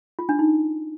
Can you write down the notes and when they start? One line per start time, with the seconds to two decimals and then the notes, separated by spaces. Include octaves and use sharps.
0.19 F4
0.29 D4
0.39 D#4